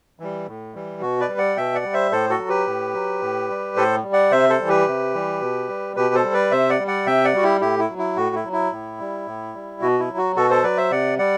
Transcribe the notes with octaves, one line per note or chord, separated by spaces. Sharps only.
E3 G3
A2
E3 G3
B2 F#4
B4 D5
G3
D5 F#5
B2 E5 G5
D5 F#5
G3
C5 E5
A2 A4 C5
F#4 A4
F#3
G4 B4
A2
F#3
A2
G3
A2 A4 C5
G3
D5 F#5
C3 C5 E5
A4 C5
E3 G3
G4 B4
C3
E3 G3
B2
G3
B2 G4 B4
A4 C5
G3
B4 D5
C3 C5 E5
D5 F#5
G3
D5 F#5
C3 E5 G5
D5 F#5
G3 F#4
E4 G4
A2 E4 G4
E4
F#3
E4
A2 F#4
E4
F#3
E4
A2
G3
A2
G3
B2 F#4
E4
F#3
F#4
B2 F#4 A4
A4 C5
F#3 B4 D5
C5 E5
C3 D5 F#5
G3 D5 F#5